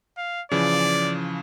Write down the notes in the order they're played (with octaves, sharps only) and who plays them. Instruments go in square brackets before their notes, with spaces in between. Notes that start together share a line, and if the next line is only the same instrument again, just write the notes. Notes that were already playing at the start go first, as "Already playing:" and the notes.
[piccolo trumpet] F5
[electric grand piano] C#3 E3 F3 [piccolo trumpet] D5